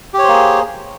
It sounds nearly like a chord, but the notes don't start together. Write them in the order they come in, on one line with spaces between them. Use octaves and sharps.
G4 C#5 C5 A#3 G#4